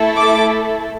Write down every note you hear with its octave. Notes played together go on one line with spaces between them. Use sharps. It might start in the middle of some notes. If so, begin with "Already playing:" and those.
Already playing: A3 E4 A4
D6